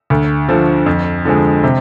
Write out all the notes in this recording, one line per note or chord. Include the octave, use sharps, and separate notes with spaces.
D2
D3 F3
F2
D3 F3 G#3
C3